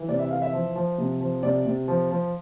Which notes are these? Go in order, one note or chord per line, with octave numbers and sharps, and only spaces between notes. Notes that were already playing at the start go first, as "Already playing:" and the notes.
Already playing: E3
C3 D5
E5
E3 F5
E5
F3
F3
C3
F3
C3 D5
C3
F3
F3